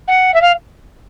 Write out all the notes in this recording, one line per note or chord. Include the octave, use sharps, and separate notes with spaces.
F#5
E5
F5